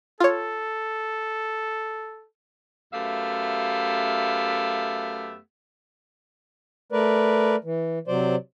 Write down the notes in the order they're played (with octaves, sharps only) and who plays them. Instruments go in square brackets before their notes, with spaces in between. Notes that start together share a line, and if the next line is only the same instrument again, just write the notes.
[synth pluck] F4 C#5 [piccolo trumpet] A4
[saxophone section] F#2 A3 B3 G4 E5 F5
[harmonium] A3 A#4 B4 D5
E3
C3 F#3 C5 D5